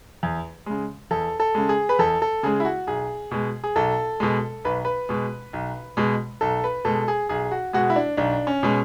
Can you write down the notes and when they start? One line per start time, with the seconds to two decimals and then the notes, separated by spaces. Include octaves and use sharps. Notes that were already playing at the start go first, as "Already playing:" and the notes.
0.23 E2
0.66 C#3 G#3
1.11 E2 A4
1.40 A4
1.55 C#3 G#3
1.69 G#4
1.89 B4
1.99 E2 A4
2.22 A4
2.43 C#3 G#3 G#4
2.60 E4
2.65 F#4
2.87 B1 G#4
3.31 B2 G#3
3.64 G#4
3.76 B1 A4
4.20 B2 G#3
4.65 B1 B4
4.85 B4
5.09 B2 G#3
5.53 B1
5.97 B2 G#3
6.41 B1 A4
6.64 B4
6.85 B2 G#3 A4
7.08 G#4
7.29 B1 G#4
7.51 F#4
7.73 B2 G#3 F#4
7.90 E4
7.96 D4
8.17 B1 D4
8.47 C#4
8.63 B2 G#3